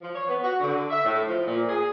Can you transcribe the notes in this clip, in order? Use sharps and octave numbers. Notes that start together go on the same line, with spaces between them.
F3
C#5
B3
F#4
D3
E5
A2
F3
A#2
G#4